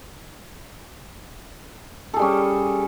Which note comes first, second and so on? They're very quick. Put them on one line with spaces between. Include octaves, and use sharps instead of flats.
A4 G#4 G3 C#4